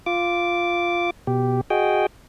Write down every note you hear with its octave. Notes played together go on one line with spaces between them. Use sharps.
F4 D6
B2 G4
F#4 G#4 D#5 G5